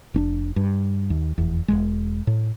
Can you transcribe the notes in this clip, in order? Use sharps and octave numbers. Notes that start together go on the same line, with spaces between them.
F1 C#4 D4
G2
D#2
F1 E2
E1 C#2 G#3
A2